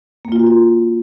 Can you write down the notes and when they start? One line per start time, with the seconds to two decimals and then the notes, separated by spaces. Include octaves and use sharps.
0.25 A#3
0.32 F4
0.39 F#4
0.47 F4